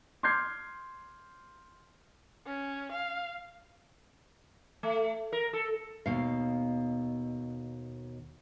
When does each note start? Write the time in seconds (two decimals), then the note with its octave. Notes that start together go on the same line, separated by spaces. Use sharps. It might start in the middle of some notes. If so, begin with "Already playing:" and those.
0.23 C6 D6 F6 G6 G#6 C7
2.46 C#4
2.92 F5
4.83 A3
5.32 A#4
5.53 A4
6.06 D#2 B2 F5